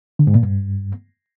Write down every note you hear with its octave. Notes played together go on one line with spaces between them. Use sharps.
D3
G#2
A#2
G2